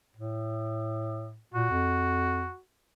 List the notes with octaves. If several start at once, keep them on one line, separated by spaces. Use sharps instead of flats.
A2
A#2 F#4
F2